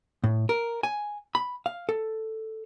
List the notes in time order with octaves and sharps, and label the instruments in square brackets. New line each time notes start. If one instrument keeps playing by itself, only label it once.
[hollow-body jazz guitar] A2
A#4
G#5
B5
F5
A4